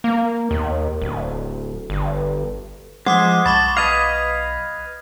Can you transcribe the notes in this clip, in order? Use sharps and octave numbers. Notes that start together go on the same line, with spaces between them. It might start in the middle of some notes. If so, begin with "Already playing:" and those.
A#3
D#2
D1
G1
F3 G#3 C5 F#5 D6 D#6
B1 A5 B5 C#6 D6
B4 D#5 F5 F6 G#6